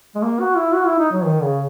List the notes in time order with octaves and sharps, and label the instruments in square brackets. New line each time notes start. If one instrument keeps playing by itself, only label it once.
[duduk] G#3
A#3
F#4
E4
F#4
E4
D#4
F#3
D#3
C#3